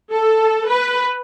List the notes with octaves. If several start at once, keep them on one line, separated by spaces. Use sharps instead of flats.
A4
B4